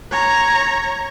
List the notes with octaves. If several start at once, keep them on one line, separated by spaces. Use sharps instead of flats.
C#5 A#5